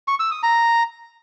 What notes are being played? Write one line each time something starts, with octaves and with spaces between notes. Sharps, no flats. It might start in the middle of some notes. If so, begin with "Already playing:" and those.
C#6
E6
D#6
A#5